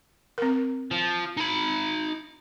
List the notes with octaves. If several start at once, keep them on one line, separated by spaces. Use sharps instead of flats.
C4 A#4
F3
D#4 B5